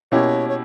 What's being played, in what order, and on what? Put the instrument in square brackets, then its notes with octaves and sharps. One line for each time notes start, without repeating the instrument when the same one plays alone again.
[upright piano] B2 A#3 C#4 E4 G4 [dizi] C#5
[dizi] C#5